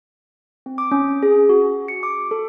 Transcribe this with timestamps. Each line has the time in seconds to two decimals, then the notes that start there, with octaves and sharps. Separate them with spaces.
0.66 C4
0.78 D6
0.92 C#4
1.23 G#4
1.49 F#4
1.88 C#7
2.03 D6
2.31 A4